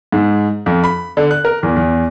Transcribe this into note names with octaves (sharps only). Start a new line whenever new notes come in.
G#2
F2
B5
D3
F#6
A#4
E2
E2